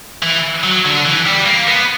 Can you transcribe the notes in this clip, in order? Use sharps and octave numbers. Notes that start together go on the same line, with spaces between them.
E3
F#3
D3
E3
G3
A#3
B3